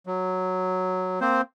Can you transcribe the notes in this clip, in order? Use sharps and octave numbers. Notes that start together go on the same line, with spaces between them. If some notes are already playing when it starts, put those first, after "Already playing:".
F#3
A#3 C4 C5